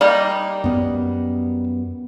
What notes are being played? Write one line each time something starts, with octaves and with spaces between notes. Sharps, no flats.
G3 A#3 D#4
F#2 B3